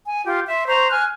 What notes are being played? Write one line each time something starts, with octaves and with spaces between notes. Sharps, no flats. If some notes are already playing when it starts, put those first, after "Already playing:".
G#5
F4 G4
E5 C6
C5 A#5 C6 C#6
G#5 F6 F#6